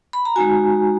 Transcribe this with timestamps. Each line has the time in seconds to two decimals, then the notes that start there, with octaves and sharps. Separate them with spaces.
0.13 B5
0.25 A#5
0.36 G#3 D#4 F#4 G#5